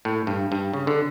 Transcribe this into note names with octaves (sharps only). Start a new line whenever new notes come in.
A2
G2
G2
C#3
D3